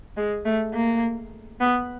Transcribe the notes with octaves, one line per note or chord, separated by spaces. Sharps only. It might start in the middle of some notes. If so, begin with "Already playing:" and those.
G#3
A3
A#3
B3